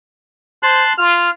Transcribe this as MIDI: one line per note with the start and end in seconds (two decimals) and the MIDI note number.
0.63 0.84 72
0.63 0.93 81
0.63 0.93 84
0.63 0.93 90
0.98 1.29 65
0.98 1.31 89